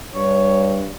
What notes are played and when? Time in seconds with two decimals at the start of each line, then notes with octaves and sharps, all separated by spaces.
0.15 G2 C#5